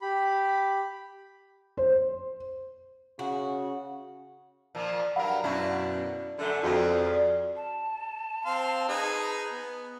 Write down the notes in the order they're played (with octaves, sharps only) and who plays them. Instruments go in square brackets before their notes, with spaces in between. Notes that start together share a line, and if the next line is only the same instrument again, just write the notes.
[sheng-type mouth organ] G4 B5
[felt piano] C5
[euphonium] C#3 [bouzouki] F#4
[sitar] A#2 F3 A#3
[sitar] G2 F#3 A#4 [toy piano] F5 F#5 B5
[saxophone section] F#2 B2 [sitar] D4 E4 F#4
[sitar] F#2 A3 [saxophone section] D3
[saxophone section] F2 [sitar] A#2 C#3 G#3 [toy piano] F#4 A4 C6
[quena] A5
[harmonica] C4 F5 C6
D#4 G#4 B4
B3